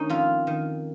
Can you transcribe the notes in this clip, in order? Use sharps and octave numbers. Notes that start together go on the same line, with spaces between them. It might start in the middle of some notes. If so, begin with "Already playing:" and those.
Already playing: D#3 C#4 D#4
F2 F4
D#3